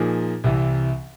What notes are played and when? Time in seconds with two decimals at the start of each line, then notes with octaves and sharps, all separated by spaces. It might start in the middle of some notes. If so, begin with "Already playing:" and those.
Already playing: A#2 F3 A#3 D#4 G#4
0.44 C2 C3 E3